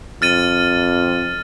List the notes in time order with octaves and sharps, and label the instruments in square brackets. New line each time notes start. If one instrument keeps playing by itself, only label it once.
[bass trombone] F2 [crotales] F6 A6 D#7